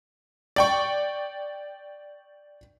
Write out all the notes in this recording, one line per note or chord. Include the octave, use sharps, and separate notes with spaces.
D5 G5 C#6